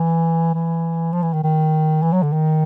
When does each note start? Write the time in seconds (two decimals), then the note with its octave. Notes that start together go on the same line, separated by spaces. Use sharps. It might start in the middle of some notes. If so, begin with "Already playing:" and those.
Already playing: E3
0.54 E3
1.13 F3
1.22 E3
1.33 D#3
1.44 D#3
2.03 E3
2.13 F#3
2.23 D3
2.33 D#3